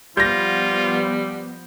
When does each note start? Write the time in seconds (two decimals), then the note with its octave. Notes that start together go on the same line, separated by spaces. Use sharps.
0.17 F3 G3 B3 F4 G6 A#6